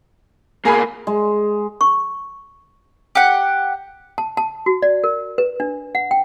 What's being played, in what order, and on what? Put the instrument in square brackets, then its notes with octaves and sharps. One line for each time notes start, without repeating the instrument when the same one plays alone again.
[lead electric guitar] B2 A#3 [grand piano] G#4 G#5 B5
[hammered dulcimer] G#3
[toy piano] C#6
[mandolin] G4 F#5
[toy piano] A5
A5
F#4
D5
A#4
B4
D4
F#5
G5